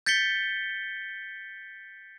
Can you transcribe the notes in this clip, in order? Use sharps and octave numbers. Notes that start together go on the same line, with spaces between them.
G6 A6 B6 C#7 G7